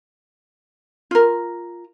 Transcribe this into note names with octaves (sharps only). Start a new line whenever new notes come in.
F4 A#4